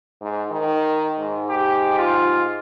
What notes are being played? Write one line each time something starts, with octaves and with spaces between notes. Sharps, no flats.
G#2
D#3
G#2
G4
F4